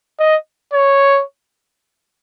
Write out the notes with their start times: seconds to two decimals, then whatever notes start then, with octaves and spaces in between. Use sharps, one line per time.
0.19 D#5
0.73 C#5